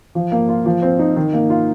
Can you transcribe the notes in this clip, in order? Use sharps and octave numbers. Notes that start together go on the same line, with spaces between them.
F3
A#3
F4
F3
C4
D#4
D#3
A#3
F4